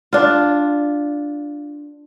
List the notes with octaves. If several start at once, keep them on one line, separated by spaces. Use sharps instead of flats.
D4 F4